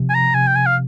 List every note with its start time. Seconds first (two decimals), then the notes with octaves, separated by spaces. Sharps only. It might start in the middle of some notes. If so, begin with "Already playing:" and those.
Already playing: C3 F3
0.10 G#5
0.15 A#5
0.34 C3 G#5
0.47 G5
0.56 G#5
0.66 F5